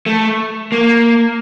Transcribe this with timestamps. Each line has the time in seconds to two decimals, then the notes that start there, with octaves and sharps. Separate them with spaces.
0.06 A3
0.72 A#3